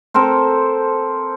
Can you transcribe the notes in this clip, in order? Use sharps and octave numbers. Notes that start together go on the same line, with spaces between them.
C4 A4 A#4 C5